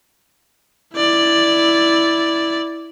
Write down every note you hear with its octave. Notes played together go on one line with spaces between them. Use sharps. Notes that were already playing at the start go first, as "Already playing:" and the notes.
E4 D5